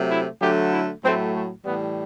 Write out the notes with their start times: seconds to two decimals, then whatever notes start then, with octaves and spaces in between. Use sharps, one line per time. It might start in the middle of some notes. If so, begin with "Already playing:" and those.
Already playing: C3 F#3 A3
0.09 E4
0.40 D3 F#3 A3 G4
0.71 E4
1.02 A2 F#3 A3 C4
1.33 A3
1.64 A2 E3 G3 B3